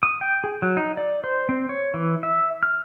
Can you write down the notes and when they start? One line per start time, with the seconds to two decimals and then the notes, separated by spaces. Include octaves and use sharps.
0.03 D#6
0.21 G5
0.44 G#4
0.62 F#3
0.77 D#4
0.97 D5
1.24 C5
1.49 C4
1.69 C#5
1.94 E3
2.23 E5
2.63 F6